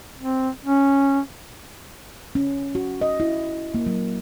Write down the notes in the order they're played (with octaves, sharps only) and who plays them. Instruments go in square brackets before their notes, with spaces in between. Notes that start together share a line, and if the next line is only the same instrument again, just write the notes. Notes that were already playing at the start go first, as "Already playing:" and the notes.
[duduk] C4
C#4
[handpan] C#4
F#4
D#5
E4
A#3
F#3